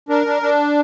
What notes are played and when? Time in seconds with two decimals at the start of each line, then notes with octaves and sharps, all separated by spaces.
0.09 D4 A#4
0.26 D4
0.42 D4